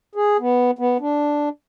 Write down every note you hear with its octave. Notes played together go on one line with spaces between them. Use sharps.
G#4
B3
B3
D4